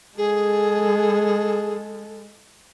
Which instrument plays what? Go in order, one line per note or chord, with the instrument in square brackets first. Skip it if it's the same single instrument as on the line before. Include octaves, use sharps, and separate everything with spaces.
[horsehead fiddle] G#3 A4 [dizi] G#4